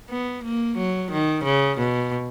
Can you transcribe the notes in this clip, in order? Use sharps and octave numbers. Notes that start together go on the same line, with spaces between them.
B3
A#3
F#3
D#3
C#3
B2